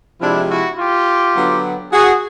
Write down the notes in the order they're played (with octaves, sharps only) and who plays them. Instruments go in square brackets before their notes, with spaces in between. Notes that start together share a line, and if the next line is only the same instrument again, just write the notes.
[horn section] C3 F3 G#3 D4 E4
E4 F#4
F4 G4
D3 F#3 B3
F#4 G#4